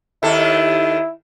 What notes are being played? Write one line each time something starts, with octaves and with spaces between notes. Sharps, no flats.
D#2 D#3 E4 A4